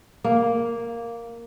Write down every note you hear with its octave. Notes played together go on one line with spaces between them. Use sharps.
A#3